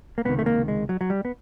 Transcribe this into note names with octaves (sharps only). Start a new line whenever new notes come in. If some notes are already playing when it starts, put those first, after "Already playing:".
A#3
C#2 C3 D#3 B3
A3
A#3
G#3
F#3
F#3
G3
B3